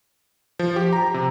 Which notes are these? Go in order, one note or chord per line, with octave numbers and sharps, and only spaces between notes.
F3
G4
A#5
C3